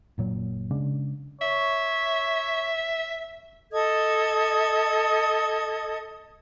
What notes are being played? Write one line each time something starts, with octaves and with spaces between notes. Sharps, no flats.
F#1 A#2 F#3
C#3 G#3 D4
C#5 E5
A4 D#5 D#6 G#6